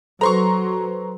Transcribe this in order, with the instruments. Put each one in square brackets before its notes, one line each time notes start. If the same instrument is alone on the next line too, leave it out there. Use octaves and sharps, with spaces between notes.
[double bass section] F#3 [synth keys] A4 B4 C5 [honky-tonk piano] A#5 C6 C#6